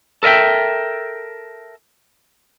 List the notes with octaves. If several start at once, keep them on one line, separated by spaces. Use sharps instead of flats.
A4 A#4 D#5 E5 G5